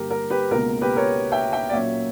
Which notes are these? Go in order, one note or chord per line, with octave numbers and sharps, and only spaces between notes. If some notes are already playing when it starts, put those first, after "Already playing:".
Already playing: G2 D3 A#3 G4 A#4
A#4
G4 B4
C#2 B2 A#3 A#4
G4 B4
A#4 C#5
E5 G5
E5 G5
D5
A#2 F#3 A#3 C#4 C#5 E5